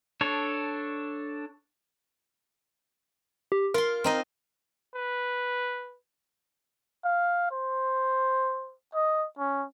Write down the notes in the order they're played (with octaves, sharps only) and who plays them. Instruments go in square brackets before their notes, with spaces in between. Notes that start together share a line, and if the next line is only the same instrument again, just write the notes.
[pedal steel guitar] D4 A4 C#5
[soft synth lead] G4
[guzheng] F4 C6 [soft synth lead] A#4
[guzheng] C4 D#4 D#5
[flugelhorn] B4
[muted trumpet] F5
C5
D#5
C#4